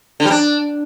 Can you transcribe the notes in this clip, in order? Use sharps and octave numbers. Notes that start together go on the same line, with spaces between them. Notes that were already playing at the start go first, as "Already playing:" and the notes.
D3
G3
D4